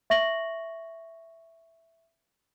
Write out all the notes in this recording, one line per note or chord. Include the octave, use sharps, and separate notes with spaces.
E5 C#6 A#6 F#7